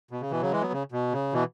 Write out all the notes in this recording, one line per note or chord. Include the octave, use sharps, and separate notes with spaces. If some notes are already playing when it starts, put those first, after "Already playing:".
B2
C#3
B2 E3
C#3 F#3
E3 G#3
F#3 B3
C#3
B2
C#3
B2 E3